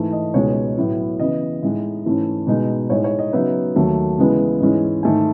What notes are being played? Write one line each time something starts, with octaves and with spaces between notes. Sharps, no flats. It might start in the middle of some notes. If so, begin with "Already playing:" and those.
Already playing: G#2 E3 A3
D#5
C#2 B2 G#3 D#4 C#5
A2 F#3 B3 E4
C#3 E3 B3 D#5
A2 G#3 D#4
G#2 E3 A3 C#4 E4
B2 G#3 D#4
A2 G#3 D#4 C#5
C#5
D#5
C#3 F#3 B3 D#4 E5
D#2 D#3 F#3 A3
C#3 E3 G#3 B3 E4
G#2 E3 G#3 C#4 E4
G#2 D#3 A3 D#4 G#5